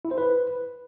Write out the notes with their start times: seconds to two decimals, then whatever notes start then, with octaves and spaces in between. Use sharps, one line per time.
0.05 E4
0.11 C5
0.18 B4